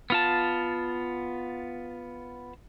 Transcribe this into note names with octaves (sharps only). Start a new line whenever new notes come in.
B3 F4 A5